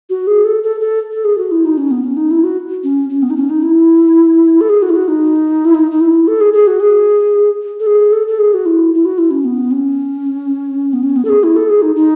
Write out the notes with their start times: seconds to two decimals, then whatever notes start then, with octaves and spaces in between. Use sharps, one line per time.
0.10 F#4
0.27 G#4
0.45 A4
0.63 A4
0.81 A4
1.11 A4
1.24 G#4
1.38 F#4
1.51 E4
1.65 D#4
1.77 C#4
1.91 B3
2.04 C#4
2.17 D#4
2.31 E4
2.43 F#4
2.84 C#4
3.09 C#4
3.22 B3
3.30 D#4
3.36 C#4
3.49 D#4
3.62 E4
4.61 A4
4.69 G#4
4.82 F#4
4.89 E4
4.95 F#4
5.08 D#4
5.65 E4
5.74 D#4
5.91 D#4
6.01 E4
6.27 A4
6.40 G#4
6.53 G#4
6.67 F#4
6.80 G#4
7.80 A4
7.86 G#4
8.12 A4
8.27 A4
8.39 G#4
8.54 F#4
8.66 E4
8.94 E4
9.05 F#4
9.18 E4
9.31 C#4
9.45 B3
9.71 C#4
10.93 B3
11.03 C#4
11.16 B3
11.25 A4
11.29 G#4
11.43 E4
11.56 A4
11.69 G#4
11.82 D#4
11.96 D#4